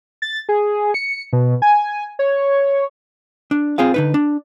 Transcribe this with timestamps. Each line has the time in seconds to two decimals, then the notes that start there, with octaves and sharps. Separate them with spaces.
0.22 A6
0.49 G#4
0.94 C#7
1.33 B2
1.62 G#5
2.19 C#5
3.51 D4
3.78 C4 F4 G#4 F5
3.94 D3 D#4 B4
4.14 D4